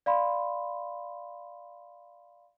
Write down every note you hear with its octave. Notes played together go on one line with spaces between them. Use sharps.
D5 F5 B5 C6